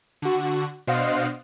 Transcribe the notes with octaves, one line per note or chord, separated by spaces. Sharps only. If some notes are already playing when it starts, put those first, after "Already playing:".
D3 F#4
B2 D4 C5 D#5 F5 F#5